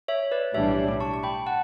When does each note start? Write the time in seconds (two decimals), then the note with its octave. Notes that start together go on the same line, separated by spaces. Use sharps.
0.08 C#5 E5
0.31 B4 D5
0.54 B1 A2 E3 G3 D4 C#5 E5
0.88 D6
1.00 A5 C#6
1.14 C#6
1.23 G5 B5
1.46 F#5 A5